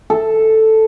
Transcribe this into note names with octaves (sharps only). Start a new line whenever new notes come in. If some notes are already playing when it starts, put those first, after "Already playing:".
A4